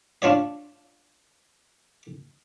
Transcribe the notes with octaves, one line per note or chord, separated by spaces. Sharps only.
D4 F4 C#5 D#5